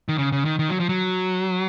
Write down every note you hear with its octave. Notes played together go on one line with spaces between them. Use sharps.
D#3
C#3
C#3
D#3
D#3
F#3
F3
F#3